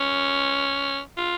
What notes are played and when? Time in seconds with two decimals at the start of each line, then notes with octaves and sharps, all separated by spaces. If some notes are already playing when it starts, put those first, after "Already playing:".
Already playing: C#4
1.17 F4